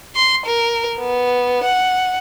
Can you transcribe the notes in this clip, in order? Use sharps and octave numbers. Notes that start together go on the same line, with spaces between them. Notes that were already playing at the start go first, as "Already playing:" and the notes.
C6
A#4
B3
F#5